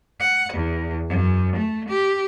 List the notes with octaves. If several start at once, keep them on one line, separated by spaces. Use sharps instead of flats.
F#5
E2
F#2
A3
G4